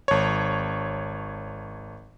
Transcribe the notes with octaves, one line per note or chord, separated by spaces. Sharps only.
G#1 C#5